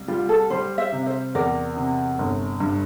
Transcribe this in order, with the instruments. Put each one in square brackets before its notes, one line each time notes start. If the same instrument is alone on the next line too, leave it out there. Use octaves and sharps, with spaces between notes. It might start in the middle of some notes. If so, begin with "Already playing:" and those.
Already playing: [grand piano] C2
[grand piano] G3 [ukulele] F4
[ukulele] A4
[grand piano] G3 [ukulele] C5
[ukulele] C5 E5
[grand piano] C3
[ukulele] C5 E5
[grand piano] E2 [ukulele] A#4 D5
[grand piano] C3
G1
G2